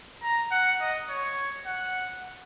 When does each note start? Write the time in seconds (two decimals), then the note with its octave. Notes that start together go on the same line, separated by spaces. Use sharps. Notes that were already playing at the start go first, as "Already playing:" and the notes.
0.23 A#5
0.51 F#5
0.81 D#5
1.09 C#5
1.66 F#5